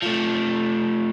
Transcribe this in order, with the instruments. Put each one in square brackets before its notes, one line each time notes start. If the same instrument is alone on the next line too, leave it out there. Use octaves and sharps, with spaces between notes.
[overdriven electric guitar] F3 A3